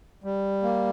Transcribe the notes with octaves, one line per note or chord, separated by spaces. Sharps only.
G3
A#3